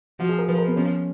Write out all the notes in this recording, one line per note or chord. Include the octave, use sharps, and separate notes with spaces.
F3 F#4
G#4
A#4
F3 B4
A#4
B3
F3 C#4